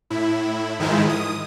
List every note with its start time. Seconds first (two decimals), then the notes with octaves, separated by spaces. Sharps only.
0.10 A2 E4
0.79 G#2 D#3 F3 G#3 E4
1.09 D#6